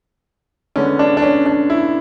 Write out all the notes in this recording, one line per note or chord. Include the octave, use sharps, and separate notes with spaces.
D3 G#3 B3 C#4
D4
D4
C#4
D4
E4